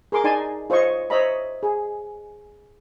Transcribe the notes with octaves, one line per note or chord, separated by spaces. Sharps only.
G#4 A#4 C6 D6
D#4 D5 G#5 A5 C6
F4 C5 C#5 D#5 C#6
C5 C#5 D#5 E5 A#5 B5
G#4